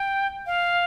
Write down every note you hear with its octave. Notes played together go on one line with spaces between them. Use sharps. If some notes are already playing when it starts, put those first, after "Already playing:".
Already playing: G5
F5